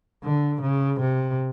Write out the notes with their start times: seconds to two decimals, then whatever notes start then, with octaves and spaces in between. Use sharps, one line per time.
0.24 D3
0.62 C#3
1.00 C3